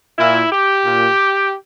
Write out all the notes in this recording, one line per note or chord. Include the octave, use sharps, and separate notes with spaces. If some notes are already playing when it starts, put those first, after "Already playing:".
A#2 E4
G4
A#2